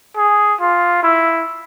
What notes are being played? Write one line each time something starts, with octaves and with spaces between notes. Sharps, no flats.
G#4
F4
E4